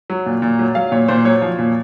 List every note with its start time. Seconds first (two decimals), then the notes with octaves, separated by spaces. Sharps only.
0.10 F#3
0.26 A#2
0.42 A#2
0.59 F#3
0.75 F#3 F5
0.92 A#2 C#5
1.08 A#2 C5
1.25 F#3 C#5
1.42 F3
1.58 A#2